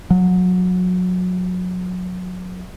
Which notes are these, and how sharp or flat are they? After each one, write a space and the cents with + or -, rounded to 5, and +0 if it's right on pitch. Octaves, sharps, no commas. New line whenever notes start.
F#3 -25